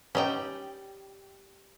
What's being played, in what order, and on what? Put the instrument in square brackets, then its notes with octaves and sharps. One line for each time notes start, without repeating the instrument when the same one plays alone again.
[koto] G3 G5 [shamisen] C#4 D#4